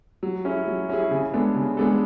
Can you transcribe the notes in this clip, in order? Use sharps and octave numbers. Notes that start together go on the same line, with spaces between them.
F#3
C#4 E4 G#4
F#3
C#4 E4 G#4
C#3
G#3 B3 D4 A4
C#3
G#3 B3 D4 A4